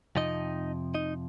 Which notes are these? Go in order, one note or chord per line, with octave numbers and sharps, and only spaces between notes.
F2 C3 F3 D#4 D#5
D#4 D#5